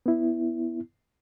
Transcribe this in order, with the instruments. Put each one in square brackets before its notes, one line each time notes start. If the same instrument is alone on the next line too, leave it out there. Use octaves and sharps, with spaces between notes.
[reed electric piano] B3 E4